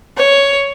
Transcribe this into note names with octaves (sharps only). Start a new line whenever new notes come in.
C#5